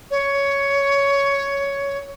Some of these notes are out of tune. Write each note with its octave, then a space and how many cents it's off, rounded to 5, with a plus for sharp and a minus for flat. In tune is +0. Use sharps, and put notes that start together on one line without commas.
C#5 +10